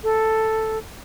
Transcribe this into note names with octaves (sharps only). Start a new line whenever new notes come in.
A4